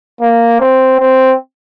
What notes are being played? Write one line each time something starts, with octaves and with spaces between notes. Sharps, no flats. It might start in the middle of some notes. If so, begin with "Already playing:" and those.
A#3
C4
C4